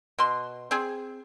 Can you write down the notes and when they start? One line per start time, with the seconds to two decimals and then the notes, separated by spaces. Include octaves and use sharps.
0.19 B2 C6
0.71 C4 G#4